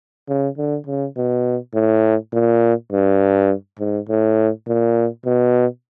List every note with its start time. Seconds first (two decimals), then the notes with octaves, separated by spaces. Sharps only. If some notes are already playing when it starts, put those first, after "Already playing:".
0.28 C#3
0.58 D3
0.87 C#3
1.16 B2
1.74 A2
2.33 A#2
2.92 G2
3.79 G#2
4.09 A2
4.67 A#2
5.25 B2